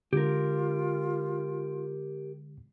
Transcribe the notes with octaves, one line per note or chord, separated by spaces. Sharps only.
D3 G#3 F4 G4 A#4